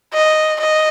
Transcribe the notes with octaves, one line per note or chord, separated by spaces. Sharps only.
D#5
D#5